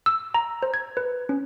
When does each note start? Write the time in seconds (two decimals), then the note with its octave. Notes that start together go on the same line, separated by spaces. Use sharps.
0.06 E6
0.34 A#5
0.63 C5
0.74 G#6
0.97 B4
1.29 C#4